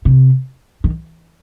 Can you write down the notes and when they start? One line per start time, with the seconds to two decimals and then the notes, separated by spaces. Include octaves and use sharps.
0.05 C3
0.84 D#3